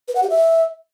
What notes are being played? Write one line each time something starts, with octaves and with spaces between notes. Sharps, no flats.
B4
F#5
G4
E5